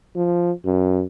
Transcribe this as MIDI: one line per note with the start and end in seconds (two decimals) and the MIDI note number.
0.16 0.52 53
0.65 1.04 42